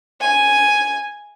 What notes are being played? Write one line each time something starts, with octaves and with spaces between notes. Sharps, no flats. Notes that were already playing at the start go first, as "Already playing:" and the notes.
G#5